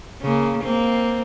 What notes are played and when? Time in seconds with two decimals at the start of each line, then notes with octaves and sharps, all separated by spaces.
0.22 C#3 A#3
0.64 A#3 C4